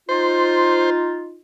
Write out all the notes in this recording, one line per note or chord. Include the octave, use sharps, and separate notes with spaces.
D#4 F4 C5